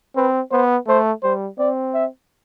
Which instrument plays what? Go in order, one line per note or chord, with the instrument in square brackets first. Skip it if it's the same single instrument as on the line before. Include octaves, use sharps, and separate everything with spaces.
[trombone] C4 [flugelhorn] B4
[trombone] B3 [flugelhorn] C5
[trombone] A3 [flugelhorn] C5
[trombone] G3 [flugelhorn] C5
[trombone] C4 [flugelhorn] D5
[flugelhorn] E5